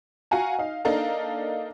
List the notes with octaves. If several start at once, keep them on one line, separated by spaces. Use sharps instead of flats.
F#4 F5 F#5 G#5 A#5
D#4 F5
A#3 D4 D#4 A4 F5 A#5